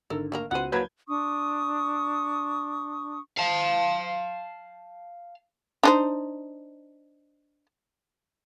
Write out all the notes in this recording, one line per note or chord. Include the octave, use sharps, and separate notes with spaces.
G#1 D3 A4 A#4
A3 A#3 A#4
C#2 B3 F#4 C5 F#5 D#7
F3 F#3 A#3 B4 G6 G#6
D4 C#6 D#6
F5 A5
D4 D#4 C5